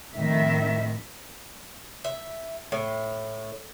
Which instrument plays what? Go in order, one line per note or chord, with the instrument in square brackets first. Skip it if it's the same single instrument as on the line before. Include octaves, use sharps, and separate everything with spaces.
[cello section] F2 A2 D#3 E5
[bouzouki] E5
A2